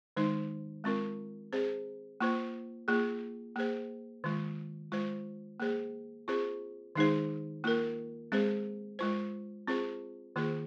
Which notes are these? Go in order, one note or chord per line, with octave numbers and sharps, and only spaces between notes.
D#3 G#3 D#4 C5
G#3 C4 F4 A#4
C4 G#4 C5
A#3 F4 C5
A#3 F4 G#4
A#3 G#4 C5
D#3 G#3 F4
G#3 F4 C5
A#3 G#4 C5
C4 F4 G#4 C5
D#3 G#3 D#4 G#4 C5
A#3 F4 A#4
G#3 C4 G#4 C5
G#3 F4 C5
C4 F4 G#4 C5
D#3 A#3 F4 G#4 C5